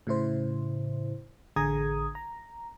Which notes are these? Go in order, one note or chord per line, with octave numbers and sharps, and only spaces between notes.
A2 C#3 E4 C5
A1 D3 G#4 A#5 D#6 G#6
A#5